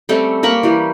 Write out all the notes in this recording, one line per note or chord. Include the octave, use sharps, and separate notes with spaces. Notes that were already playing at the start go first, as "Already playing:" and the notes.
G3 A3 C4 C#4
A#3 A#4 B5 C#6
E3 G3 G4